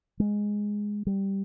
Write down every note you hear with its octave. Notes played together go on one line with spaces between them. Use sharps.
G#3
G3